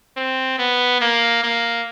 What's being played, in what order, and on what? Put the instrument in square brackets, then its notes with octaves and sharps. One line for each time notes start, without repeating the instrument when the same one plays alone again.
[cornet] C4
B3
A#3
A#3